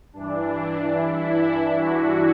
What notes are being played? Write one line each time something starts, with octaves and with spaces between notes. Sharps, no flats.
G2 E3 D4
E4
F#4